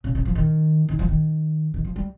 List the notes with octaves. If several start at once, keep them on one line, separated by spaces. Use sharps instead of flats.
C#3
C#3
F3
D#3
D#3
F3
D#3
D#3
F3
G3